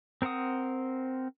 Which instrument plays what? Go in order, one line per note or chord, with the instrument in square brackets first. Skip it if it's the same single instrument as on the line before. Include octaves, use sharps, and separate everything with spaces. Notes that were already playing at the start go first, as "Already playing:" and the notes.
[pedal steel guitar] C4 A#4 C5 F#5 D#6